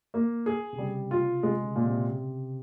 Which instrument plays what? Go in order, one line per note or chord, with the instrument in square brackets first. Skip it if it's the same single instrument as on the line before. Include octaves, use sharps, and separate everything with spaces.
[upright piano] A#3
G#4
[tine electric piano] C3
[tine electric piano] C#3 [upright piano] G3
[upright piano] F4
[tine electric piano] C3 [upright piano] G#3
[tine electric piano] C#3
[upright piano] A#2
[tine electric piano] C3